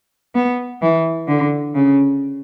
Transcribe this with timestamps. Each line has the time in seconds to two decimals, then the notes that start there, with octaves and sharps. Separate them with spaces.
0.35 B3
0.81 E3
1.28 D3
1.75 C#3